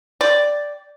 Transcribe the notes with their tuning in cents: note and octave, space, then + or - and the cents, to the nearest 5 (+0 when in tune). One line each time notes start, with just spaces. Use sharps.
D5 +0 G5 +0